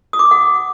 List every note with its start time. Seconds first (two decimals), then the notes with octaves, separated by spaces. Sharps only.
0.13 D#6
0.19 D6
0.25 D#6
0.31 F#5